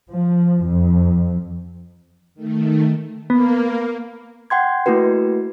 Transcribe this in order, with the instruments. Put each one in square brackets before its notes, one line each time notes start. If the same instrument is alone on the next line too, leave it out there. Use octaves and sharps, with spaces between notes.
[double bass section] F3
F2
[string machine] D#3 A3
[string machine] A#3 [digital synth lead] B3
[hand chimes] F#5 G5 C6 G#6
A3 A#3 E4 F#4 B4